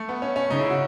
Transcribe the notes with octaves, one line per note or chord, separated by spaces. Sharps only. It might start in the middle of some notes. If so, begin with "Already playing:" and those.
Already playing: A3
B3
C#4
C#4
C#3 D#4
E4
F#4